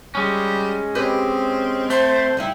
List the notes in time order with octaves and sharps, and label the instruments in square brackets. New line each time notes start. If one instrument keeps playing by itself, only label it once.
[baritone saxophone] G3 [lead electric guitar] G#3 C#4
[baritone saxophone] C4 [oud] G4 B4 D#5
[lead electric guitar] A3 [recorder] C5
[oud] G3 D#4 E4